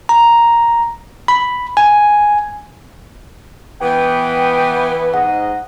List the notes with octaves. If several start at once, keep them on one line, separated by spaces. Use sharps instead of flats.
A#5
B5
G#5
E3 B3 G5
G#2 D#5 F#5